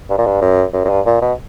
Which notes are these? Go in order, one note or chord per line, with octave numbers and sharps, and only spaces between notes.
G2
A#2
G2
F#2
F#2
F#2
G2
A#2
B2